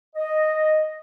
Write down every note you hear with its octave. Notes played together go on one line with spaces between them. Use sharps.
D#5